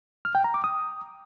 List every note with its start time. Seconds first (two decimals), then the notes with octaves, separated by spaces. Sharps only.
0.25 F6
0.35 G5
0.44 A#5
0.54 D6
0.64 D#6